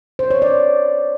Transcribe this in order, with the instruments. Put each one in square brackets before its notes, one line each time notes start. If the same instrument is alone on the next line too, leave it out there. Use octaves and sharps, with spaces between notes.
[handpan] C5
C#5
D5